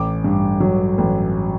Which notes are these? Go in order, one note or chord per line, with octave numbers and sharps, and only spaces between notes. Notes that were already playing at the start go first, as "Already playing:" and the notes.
Already playing: A1 D6
G2
F#3
A1